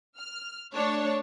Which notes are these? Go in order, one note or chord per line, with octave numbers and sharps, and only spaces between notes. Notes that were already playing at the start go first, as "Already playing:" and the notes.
F6
A3 D4 C#5 A5